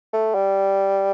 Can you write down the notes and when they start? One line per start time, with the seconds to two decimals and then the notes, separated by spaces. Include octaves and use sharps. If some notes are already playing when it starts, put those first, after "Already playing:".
0.13 A3
0.35 G3